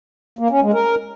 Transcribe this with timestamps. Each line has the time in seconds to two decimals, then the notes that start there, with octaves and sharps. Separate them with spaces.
0.39 A#3
0.50 C#4
0.62 G#3
0.74 A#4